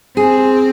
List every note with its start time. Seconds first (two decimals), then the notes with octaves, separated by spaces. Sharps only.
0.17 C4 G#4